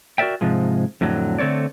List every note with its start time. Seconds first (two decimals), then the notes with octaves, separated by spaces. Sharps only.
0.18 F#4 A#4 C5 D5 E5 G5
0.41 G#2 C3 F3 G#3
1.01 F2 A2 D3 F#3
1.39 D3 A3 C4 C#5 D5